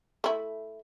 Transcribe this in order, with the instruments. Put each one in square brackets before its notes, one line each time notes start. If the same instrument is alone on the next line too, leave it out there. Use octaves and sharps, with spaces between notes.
[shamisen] A3 E4